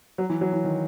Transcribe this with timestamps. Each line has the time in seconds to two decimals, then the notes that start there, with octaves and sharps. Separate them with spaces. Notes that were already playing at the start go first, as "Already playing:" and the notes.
0.18 F#3
0.30 E3
0.41 F#3
0.53 E3
0.64 D#3